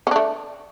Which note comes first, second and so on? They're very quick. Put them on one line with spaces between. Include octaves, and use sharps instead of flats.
C#4 D4 A3